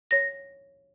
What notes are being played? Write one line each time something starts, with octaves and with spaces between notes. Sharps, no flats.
C#5 A#6